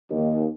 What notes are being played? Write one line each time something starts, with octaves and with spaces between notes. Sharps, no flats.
D#2